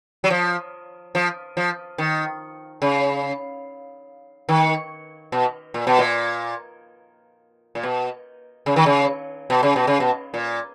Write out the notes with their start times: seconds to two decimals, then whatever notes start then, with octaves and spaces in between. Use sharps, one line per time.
0.24 F#3
0.30 F3
1.15 F3
1.57 F3
1.98 D#3
2.82 C#3
4.49 D#3
5.32 B2
5.74 A#2
5.87 B2
5.99 A#2
7.75 A#2
7.83 B2
8.66 C#3
8.76 D#3
8.86 C#3
9.50 B2
9.63 C#3
9.76 B2
9.87 C#3
10.00 B2
10.34 A#2